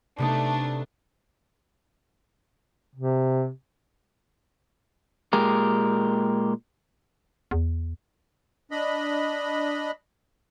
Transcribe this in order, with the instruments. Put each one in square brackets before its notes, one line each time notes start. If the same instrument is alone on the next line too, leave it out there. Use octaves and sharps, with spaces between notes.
[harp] C3 B3 D#4 [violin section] A3 D4
[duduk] C3
[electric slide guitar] A#2 G#3 G4 A#4
[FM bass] E2
[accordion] D4 D#5 B5